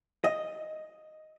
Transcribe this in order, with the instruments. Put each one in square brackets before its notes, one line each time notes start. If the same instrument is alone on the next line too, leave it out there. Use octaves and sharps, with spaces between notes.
[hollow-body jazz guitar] D#5